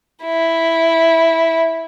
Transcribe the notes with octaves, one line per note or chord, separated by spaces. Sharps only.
E4